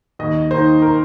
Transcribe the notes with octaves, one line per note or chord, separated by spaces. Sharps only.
D#2 D#5
D#3 A#3 D#4 C5
A#4